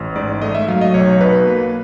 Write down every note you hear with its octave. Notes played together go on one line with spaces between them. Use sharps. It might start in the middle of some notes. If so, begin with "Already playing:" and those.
Already playing: A1
G#2 D5
A3 D#5
E5
F#3 F5
D#5
B1 C#5
B2 B4
A#3